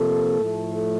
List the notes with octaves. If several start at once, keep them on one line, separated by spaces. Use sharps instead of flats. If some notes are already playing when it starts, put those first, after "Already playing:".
Already playing: C3 F3 A#3 A4
A2 F3 A3